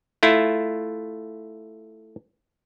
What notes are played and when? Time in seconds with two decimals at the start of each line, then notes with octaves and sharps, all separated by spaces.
0.23 A3 E4 F4